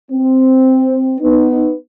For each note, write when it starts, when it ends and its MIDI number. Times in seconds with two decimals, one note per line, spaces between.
0.11 1.15 60
1.21 1.74 59
1.21 1.74 63